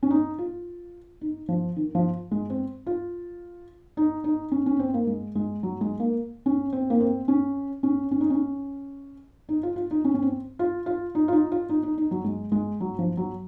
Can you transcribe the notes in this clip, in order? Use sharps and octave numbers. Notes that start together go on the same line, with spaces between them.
C#4
D#4
F4
D#4
F3
D#3
F3
G#3
C4
F4
D#4
D#4
C#4
C#4
C4
A#3
G#3
G#3
F#3
G#3
A#3
C#4
C4
A#3
C4
C#4
C#4
C#4
D#4
C#4
D#4
F4
F4
D#4
C#4
C#4
C4
F4
F4
D#4
F4
D#4
F4
D#4
D#4
D#4
F#3
G#3
G#3
F#3
F3
F#3